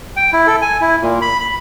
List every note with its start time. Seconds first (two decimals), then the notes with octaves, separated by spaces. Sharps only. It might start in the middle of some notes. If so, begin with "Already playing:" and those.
0.17 G5
0.33 E4
0.47 A4
0.62 G#5
0.81 E4
1.02 A#2
1.22 B5
1.40 B5